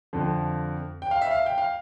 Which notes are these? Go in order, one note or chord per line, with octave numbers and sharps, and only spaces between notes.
F2 D3 F3
G5
F5
E5
F5
G5
F5